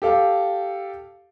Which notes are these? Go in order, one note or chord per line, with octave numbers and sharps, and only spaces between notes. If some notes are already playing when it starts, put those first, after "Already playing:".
G4 A4 F5